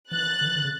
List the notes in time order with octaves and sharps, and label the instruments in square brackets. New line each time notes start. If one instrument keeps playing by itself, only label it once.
[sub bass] E3 [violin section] F#6 A6
[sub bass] D3
E3
D3
C#3